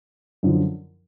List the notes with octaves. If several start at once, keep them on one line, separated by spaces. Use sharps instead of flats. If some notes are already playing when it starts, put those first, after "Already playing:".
F#2 D3 F3